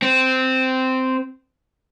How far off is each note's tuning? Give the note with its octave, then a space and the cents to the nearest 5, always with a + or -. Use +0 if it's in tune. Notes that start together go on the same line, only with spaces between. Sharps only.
C4 -10